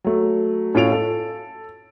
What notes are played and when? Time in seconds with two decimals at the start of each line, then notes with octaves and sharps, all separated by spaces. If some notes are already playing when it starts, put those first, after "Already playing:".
0.04 F#3 A3
0.75 A2 C#4 F4 D7 F7
0.92 A4